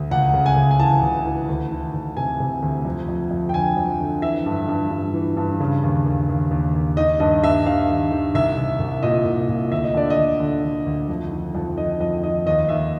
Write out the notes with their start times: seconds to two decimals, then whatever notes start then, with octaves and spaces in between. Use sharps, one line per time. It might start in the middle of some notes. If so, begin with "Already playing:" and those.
Already playing: D2
0.11 C#2 F#5
0.34 C#3
0.46 G#5
0.56 C#3
0.71 G#5
0.79 E3 A5
1.02 C#2
1.25 E3
1.48 D2
1.71 D#3
1.94 D2
2.17 C3 G#5
2.40 C3
2.62 D2
2.85 F2
3.09 F2
3.31 F2
3.49 G5
3.54 D3 G#5
3.77 F2
4.00 D3
4.22 E3 E5
4.46 G2
4.68 G2
4.91 G2
5.14 E3
5.37 G2
5.60 C#3
5.83 D#2
6.06 D#2
6.29 D#2
6.51 D#2
6.74 D#2
6.97 D#3 D#5
7.20 G2 D#5
7.43 G2 E5
7.66 D#3 F5
7.89 D#3
8.11 D#3
8.35 C2 E5
8.58 C2
8.80 C2
9.03 A#2 D#5
9.25 C2
9.49 A#2
9.72 D2 E5
9.84 D#5
9.94 D3 D5
10.10 D#5
10.18 D3
10.40 D3
10.64 D3
10.86 D2
11.08 F2
11.31 D#3
11.55 F2
11.77 D#3 D#5
12.01 F2 D#5
12.23 D#3 D#5
12.46 D#2 D#5
12.69 D#2 E5